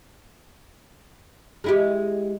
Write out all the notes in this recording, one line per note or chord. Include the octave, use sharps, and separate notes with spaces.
G#3 E4 G4